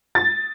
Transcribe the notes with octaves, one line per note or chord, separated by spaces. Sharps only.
A6